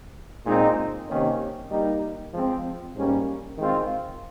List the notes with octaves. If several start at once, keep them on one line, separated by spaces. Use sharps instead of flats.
A#2 G#3 C4 D#4
C3 D#3 A#3 C#4
G3 A#3 D#4
F3 G#3 C4
G#2 G3 A#3 C#4
D#3 G#3 C4 F4